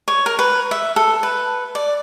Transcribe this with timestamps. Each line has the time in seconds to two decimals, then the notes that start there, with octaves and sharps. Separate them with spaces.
0.08 C#5
0.26 A#4
0.39 B4
0.71 E5
0.96 A4
1.23 B4
1.75 D5